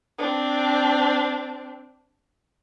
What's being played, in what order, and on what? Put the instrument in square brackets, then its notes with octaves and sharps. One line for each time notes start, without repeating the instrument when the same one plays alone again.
[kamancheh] C4 D4